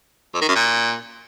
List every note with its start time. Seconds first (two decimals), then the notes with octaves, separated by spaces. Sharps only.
0.34 F2
0.41 D#3
0.49 F#2
0.56 A#2